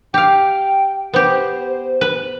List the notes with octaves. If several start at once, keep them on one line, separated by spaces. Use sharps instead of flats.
G4 F5 G5
B3 G4 C5
B4